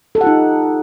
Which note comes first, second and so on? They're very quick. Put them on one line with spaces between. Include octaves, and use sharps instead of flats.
A4 G4 F#5 F4 D#4